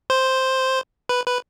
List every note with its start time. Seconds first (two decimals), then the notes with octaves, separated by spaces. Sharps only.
0.10 C5
1.09 B4
1.27 B4